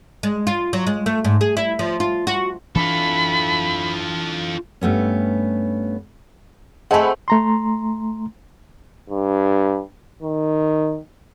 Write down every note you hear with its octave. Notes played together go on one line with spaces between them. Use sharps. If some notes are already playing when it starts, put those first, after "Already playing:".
G#3
F4
F#3
G#3
A3
G#2
G#4
E4
F3
F4
F#4
E3 C#4 D4 F4 A4 B5
G2 A3 B3 C#4
A3 C4 G#4 D#5 F#5 G#5 A5 B5
A3 A#5 C6
G2
D#3